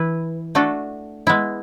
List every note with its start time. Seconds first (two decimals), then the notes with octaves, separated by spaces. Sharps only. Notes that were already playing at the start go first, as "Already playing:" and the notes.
Already playing: E3 E4 B4
0.55 A3 D4 F#4 A4
1.27 G#3 B3 E4